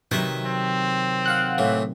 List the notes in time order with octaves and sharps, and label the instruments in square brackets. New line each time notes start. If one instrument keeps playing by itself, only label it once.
[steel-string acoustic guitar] C3 D#3 F#3 [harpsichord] B4 D#5 E5
[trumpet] C4
[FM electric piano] F5 F#5 F#6
[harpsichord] A2 E3